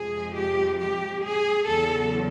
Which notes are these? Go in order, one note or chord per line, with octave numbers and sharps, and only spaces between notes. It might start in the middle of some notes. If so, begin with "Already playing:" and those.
Already playing: F2 C3 F3 G#3 G#4
G4
G4
G#4
E2 C#3 F#3 A4